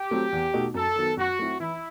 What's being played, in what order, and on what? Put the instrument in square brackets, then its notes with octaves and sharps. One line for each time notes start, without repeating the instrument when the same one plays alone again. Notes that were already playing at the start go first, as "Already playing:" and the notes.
Already playing: [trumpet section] G4
[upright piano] F#3 A3 C4
E2
B2 A3 D#4 F#4
[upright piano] F#2 [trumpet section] A4
[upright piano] D#3 F#3 B3
[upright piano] F#2 [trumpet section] F#4
[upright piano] F#3 A3 C4 E4
[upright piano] E3 [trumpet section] E4